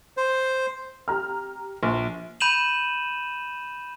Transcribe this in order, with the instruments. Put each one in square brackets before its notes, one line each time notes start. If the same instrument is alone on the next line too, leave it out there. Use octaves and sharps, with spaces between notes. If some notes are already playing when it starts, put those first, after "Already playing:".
[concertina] C5
[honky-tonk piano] G4 A#5 F6
[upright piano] A#1
[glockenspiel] B5 G6 D#7 E7 F#7